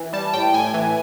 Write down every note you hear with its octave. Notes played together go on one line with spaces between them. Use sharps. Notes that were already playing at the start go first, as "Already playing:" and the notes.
Already playing: E3
G3 A5
A2 G5
A2 G#5
E3